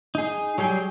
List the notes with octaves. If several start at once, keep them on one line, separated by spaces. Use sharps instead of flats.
D#4 G#4
F#3 G3 G#4 G5